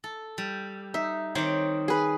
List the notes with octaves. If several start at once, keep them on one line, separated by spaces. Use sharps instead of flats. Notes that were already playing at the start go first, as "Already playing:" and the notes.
A4
G3
D#4 E5
D#3 C4 C5 C#5 D6
G#4 B4